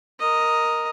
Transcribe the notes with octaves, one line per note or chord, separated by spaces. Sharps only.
A#4 D#5